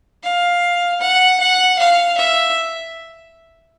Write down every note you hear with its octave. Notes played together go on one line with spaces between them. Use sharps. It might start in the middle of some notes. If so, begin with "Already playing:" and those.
F5
F#5
F#5
F5
E5